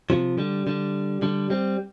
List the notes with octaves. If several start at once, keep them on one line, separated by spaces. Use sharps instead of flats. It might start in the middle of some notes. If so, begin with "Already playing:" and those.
C3 F3
D3 G3
D3 G3
D3 G3
G3 C4